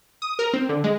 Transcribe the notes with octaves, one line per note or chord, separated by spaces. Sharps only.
D#6
A#4
C4
D3
G#3